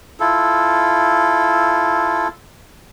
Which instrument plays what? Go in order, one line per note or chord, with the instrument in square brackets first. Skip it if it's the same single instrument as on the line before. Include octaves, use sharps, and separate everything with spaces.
[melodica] E4 F4 A4